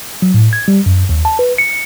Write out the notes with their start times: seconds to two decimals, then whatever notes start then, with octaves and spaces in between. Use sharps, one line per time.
0.22 F#3
0.34 A2
0.53 G#6
0.68 G3
0.86 F#2
1.09 D#2
1.25 A5
1.39 B4
1.58 C#7